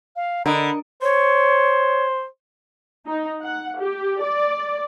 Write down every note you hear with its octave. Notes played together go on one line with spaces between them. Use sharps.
F5
D3 A#4 D#5 B5
C5 C#5
D#4
F#5
G4
D5